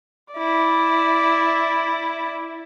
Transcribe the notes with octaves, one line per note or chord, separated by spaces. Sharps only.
E4 D5